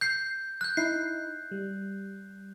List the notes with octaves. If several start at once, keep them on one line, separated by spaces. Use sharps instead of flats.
G6 C7
F#6 G6
D#4 E4 C7
G3